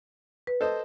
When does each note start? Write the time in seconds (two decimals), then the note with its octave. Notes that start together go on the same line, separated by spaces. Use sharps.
0.47 B4
0.61 A4 C5 D#5